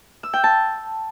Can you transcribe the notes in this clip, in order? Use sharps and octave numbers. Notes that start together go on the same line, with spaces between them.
E6
G5
A5